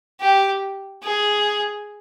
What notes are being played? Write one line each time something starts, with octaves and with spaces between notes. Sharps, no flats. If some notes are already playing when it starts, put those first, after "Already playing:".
G4
G#4